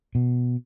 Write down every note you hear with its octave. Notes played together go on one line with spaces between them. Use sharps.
B2